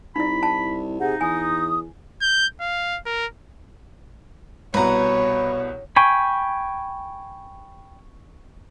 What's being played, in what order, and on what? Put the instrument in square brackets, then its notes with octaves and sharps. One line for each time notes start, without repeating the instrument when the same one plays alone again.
[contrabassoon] C2 [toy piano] D#4 E4 [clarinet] B5
[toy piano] A5
[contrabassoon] C3 [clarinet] D#4 [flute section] G#4 F#5
[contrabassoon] E2 [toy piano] G#5 [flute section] D#6
[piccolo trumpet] G6
F5
A#4
[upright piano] C2 B2 [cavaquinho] B4 A#5 [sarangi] C#5
[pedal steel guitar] G5 G#5 B5 [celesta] C#6